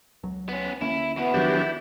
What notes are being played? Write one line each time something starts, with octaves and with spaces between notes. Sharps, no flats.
C#2 F#3
B3 C#4
D2 A#3 C#4 E4
B2 B3 E4
D1 D#3 F3 F#3 D4 E4 G4